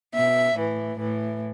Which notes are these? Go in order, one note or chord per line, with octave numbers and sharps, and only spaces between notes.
B2 E5
A2 E3
A2 E3